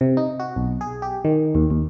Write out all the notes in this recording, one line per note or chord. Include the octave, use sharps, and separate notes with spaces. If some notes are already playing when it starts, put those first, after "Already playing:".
C3
D#4
F#4
B1
G#4
G4
D#3
D#2
D#2